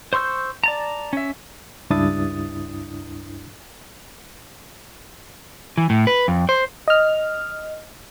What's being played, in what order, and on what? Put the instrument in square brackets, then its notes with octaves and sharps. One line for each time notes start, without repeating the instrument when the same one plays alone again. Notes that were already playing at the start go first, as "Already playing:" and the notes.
[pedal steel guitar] C5 C6 C#6 E6 G6
D5 A5 A#5
C#4 E5
[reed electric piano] C#2 G2 D4 E4 D#6 A6
[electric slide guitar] E3
A2
B4
F2
C5
[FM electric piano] D#5 F6